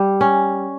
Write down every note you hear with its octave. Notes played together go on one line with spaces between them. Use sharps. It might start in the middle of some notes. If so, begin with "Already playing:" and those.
Already playing: G3
C#4